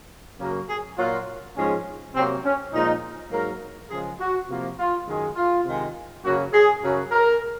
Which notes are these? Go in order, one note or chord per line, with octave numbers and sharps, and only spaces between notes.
F#2 C#3 F#3 A#3 A#4
G#4
A#2 F#3 A#3 F4
G#2 F3 G#3 C#4
C3 F#3 A#3 C4
C#4
A#2 F3 G#3 D#4
G#2 F#3 A#3 A#4
C#3 F3 G#3 G#4
F#4
C3 F3 A#3
F4
F#2 D#3 G#3
F4
C3 D#3 G#3
F#2 C#3 F#3 A#3 F#4
G#4
F#2 C#3 F#3
A#4